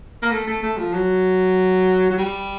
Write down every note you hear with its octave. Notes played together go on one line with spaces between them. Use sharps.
A#3
A3
A3
A3
F3
F#3
F#3
G3